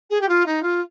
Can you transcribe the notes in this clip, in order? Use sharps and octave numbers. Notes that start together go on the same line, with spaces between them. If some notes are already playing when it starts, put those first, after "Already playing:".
G#4
G4
F4
D#4
F4